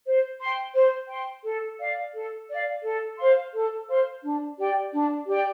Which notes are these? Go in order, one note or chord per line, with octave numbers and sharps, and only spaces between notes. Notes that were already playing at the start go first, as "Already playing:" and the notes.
C5
G5 C6
C5
G5 C6
A4
D5 F5
A4
D5 F5
A4
C5 F5 C6
A4
C5 F5 C6
D4
G4 D5 G5
D4
G4 D5 G5